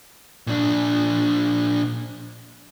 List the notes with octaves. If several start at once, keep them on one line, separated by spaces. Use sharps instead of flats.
A#2 D4